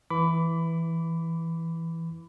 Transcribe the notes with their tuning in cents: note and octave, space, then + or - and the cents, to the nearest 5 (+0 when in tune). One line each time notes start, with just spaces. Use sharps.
E3 +0 B5 +20 D6 -25